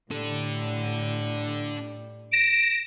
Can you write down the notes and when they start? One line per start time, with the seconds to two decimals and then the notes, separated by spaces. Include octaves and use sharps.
0.11 A2 G3 D4 A4
2.32 A#6 D7 E7